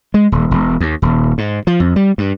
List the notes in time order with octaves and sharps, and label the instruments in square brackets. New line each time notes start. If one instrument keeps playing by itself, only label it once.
[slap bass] G#3
D#1
E1
D#2
D#1
G#2
F3
F2
G3
G2